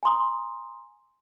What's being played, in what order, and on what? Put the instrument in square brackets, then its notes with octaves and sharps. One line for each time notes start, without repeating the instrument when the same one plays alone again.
[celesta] G#5 A#5 C6 D#6